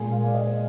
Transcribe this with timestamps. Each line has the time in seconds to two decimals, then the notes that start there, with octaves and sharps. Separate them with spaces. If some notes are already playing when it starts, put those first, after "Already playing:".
Already playing: A#2 G#3 G#5
0.11 F5
0.24 D5
0.34 D#5